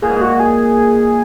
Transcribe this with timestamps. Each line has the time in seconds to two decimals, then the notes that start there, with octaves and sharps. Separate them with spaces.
0.02 A#2 G#4
0.10 G#2
0.17 A#2 F#4
0.40 G#4